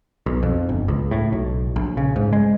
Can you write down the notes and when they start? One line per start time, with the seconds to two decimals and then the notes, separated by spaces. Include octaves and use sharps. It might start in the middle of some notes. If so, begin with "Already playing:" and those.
0.26 B1
0.43 F2
0.69 G1
0.88 C#2
1.11 A2
1.32 B1
1.76 A#1
1.97 C#3
2.16 G#2
2.33 G#3